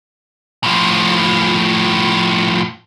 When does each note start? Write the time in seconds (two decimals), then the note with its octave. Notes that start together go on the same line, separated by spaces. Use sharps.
0.64 A2 F3